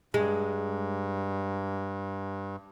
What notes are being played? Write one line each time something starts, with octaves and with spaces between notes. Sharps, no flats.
G2 G#3